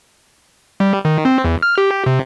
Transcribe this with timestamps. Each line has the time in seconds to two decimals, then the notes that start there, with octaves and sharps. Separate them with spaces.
0.80 G3
1.05 D#3
1.25 C4
1.44 E2
1.62 F6
1.78 G4
2.06 C3